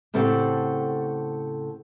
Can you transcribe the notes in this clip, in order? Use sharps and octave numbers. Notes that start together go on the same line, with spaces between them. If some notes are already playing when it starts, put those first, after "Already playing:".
A2 C#3 C4 G4 A4 F#5